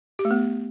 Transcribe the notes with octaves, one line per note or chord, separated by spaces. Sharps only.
G4
A3
B3